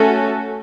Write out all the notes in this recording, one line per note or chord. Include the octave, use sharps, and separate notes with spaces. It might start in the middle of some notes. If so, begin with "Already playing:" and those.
Already playing: A3 C#4 F#4 A4